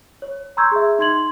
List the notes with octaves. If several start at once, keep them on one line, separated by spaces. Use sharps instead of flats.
C#5
A#5 C6 C#6 E6 G6 G#6
G#4 E5
D#4 C6 G#6 F#7